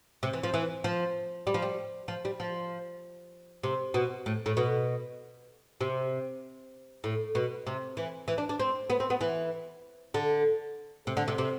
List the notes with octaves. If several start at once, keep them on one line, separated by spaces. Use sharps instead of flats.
C3
E3
F3
E3
F3
G3
F3
G3
F3
G3
F3
C3
B2
A2
A2
B2
C3
A2
B2
C3
E3
E3
D4
D4
C4
B3
C4
B3
E3
D3
C3
D3
C3
C3